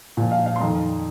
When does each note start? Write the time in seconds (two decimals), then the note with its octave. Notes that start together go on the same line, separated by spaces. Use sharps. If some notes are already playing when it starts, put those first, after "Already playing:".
0.17 A#2 F3
0.32 F5
0.46 F5
0.56 C6
0.60 F2 D#3 A#5